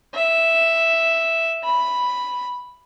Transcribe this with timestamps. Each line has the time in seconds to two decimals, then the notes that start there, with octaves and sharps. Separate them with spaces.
0.14 E5
1.64 B5